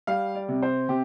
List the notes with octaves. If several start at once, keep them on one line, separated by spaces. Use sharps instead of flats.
G3 F5
D5
C3
C5
C3 G4